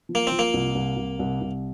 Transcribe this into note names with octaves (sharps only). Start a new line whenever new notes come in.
F3
A#3
F3 C4
A#3
C2
C2
C2
C2
C2